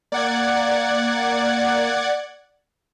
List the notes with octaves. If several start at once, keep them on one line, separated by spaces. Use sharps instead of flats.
A#3 D5 F#5 G#6